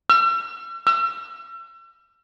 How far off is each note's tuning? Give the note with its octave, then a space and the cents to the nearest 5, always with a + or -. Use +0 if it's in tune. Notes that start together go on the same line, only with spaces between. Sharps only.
E6 +45
E6 +40